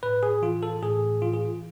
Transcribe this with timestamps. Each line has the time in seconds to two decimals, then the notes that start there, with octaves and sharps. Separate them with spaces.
0.03 A2 B4
0.23 G#4
0.42 E3 F4
0.63 A4
0.83 A2 G#4
1.22 E3 F4
1.34 G#4
1.45 F4